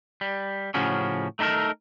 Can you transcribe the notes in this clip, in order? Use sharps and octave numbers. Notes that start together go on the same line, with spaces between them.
G3
A2 C#3 F3 C#4 F#4
A3 D#4 G4 A4 A#4